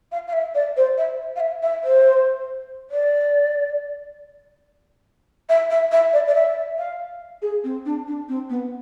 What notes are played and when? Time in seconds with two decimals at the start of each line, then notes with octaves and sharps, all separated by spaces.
0.12 F5
0.28 F5
0.33 E5
0.55 D5
0.77 C5
0.98 E5
1.36 F5
1.40 E5
1.63 E5
1.84 C5
2.91 D5
5.49 E5
5.70 E5
5.92 E5
6.13 D5
6.28 D5
6.35 E5
6.78 F5
7.42 G#4
7.64 C4
7.86 D4
8.08 D4
8.29 C4
8.50 B3